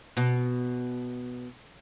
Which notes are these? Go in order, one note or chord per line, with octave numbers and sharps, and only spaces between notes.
B2